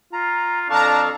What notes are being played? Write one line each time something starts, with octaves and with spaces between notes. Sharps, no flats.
F4 A#5
F2 D4 A4 F5 A5 A#5 C#6